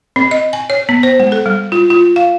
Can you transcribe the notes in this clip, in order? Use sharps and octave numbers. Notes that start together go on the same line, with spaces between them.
C4
D#5
G#5
C#5
B3
C5
G#3
A4
G3
F4
F4
F5